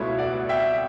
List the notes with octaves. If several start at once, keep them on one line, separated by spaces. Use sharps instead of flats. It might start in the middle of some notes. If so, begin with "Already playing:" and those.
Already playing: C#2 B2 A3 E4 C#5 E5
D5 F#5
E5 G5